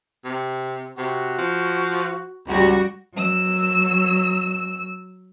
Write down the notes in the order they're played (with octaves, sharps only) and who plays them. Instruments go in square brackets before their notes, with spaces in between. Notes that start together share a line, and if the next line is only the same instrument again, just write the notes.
[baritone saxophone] C3
[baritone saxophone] C3 [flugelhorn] F#4
[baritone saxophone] F3
[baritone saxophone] C#2 [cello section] G3 F#4 G4
[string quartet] F#3 E6